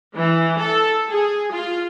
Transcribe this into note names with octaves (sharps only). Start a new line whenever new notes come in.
E3
A4
G#4
F4